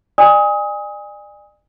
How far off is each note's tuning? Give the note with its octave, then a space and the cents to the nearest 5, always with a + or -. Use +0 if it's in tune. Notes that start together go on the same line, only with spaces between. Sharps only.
D5 +40 G#5 -25 D#6 +25